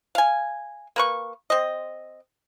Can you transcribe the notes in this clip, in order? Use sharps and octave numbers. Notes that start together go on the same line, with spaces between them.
F5 G#5
A#3 B4 C#6
C4 D#5